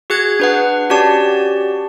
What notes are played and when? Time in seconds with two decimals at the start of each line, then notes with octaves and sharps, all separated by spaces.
0.10 F#4 G#4 F#6 G#6
0.40 D4 B4 F#5
0.90 C#4 F#4 G4 D5 A5